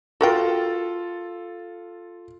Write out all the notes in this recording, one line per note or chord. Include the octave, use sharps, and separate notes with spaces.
F4 F#4 A4 A#4 G5